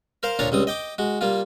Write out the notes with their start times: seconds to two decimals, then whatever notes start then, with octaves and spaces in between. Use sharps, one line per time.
0.23 A#4 C5 F5
0.39 D2 A#2 D4 F4 C#5 A#5
0.52 C#2 G3 C4 D#6
0.67 D#5 G5 D6
0.98 G#3 F#4
1.21 G3 A#3 F4